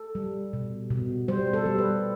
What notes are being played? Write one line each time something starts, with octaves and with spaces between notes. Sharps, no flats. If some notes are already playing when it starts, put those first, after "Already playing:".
Already playing: A4
G3
B2
B2
G3 C5
A4
G3
B4